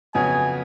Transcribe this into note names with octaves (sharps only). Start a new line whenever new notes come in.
F2 C#3 F#3 B3 G#5